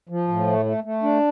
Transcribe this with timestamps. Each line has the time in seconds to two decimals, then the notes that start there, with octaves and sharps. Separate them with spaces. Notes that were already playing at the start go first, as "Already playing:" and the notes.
0.09 F3
0.28 A2
0.47 A3
0.65 A3
0.84 A3
1.03 D4